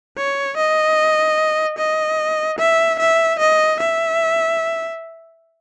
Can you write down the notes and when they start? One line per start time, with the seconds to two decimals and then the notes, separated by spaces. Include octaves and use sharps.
0.17 C#5
0.57 D#5
1.78 D#5
2.59 E5
2.99 E5
3.39 D#5
3.80 E5